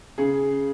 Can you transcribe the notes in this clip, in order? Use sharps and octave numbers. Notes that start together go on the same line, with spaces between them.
C#3 G#4